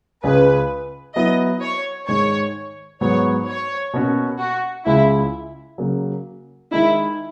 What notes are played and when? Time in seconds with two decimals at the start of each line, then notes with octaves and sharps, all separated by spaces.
0.23 C#2 C#3 G#3 C#4 G#4 B4
1.16 F#3 B3 E4 D#5
1.62 C#5
2.08 G#2 D#3 G#3 C#5
3.01 G#2 F#3 B3 C#5
3.47 C#5
3.93 B2 A#3 C#4 F#4
4.40 F#4
4.86 C#2 C#3 G#3 C#4 E4
5.78 C#3 F#3 A#3
6.71 D#3 G#3 D#4 E4